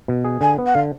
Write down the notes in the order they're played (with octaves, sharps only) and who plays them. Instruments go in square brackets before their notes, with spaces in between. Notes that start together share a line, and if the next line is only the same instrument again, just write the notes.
[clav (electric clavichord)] B2
G#4
[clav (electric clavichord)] D3 [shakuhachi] G#5
[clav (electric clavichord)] B3
[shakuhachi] F#5
[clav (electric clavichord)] D3 [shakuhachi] F5